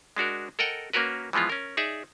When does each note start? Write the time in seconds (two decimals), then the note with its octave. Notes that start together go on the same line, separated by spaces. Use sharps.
0.17 G#3 D4 F#4 A#4
0.59 A4 A#4 D#5 F#5 G5
0.93 A#3 C#4 F#4 A#4 B4
1.33 E3 F3 G#3 B3 F4
1.49 C#4 A#4
1.77 D#4 G#4 D5 E5